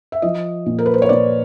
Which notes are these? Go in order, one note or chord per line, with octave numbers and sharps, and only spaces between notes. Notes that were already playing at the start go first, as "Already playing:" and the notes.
E5
F3 D#5
A#2
A#4
B4
C5
C#5
A#2 D5